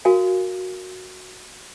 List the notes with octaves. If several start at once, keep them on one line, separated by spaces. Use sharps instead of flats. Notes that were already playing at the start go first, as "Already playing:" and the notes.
F#4 A#4 F5 G#5